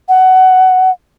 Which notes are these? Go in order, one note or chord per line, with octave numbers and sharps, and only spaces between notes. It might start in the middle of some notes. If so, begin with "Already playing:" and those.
F#5